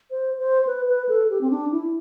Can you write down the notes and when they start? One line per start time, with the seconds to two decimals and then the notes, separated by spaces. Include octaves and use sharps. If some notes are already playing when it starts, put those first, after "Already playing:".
0.11 C5
0.39 C5
0.67 B4
0.88 B4
1.09 A4
1.30 G4
1.41 C4
1.51 D4
1.72 E4